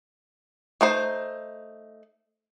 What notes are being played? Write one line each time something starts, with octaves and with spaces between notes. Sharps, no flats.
A3 D#4 C5